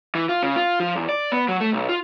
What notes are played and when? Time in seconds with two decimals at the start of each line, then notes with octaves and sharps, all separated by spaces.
0.15 E3
0.29 F4
0.43 C#3
0.56 F4
0.80 F3
0.96 E2
1.09 D5
1.32 B3
1.48 F#3
1.60 A3
1.73 B1
1.89 F4